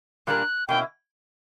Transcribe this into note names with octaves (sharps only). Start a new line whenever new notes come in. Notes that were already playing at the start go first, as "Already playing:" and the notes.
A#2 G3 A#3 D4 A#4 F#6
B2 A#3 C#4 E4 G5